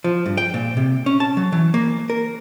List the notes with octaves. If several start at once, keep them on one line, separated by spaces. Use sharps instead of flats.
F3
G2
G5
A#2
C3
C#4
A5
F#3
E3
A#3
A#4